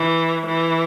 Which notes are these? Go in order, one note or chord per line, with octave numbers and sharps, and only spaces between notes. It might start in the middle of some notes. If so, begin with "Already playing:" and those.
Already playing: E3
E3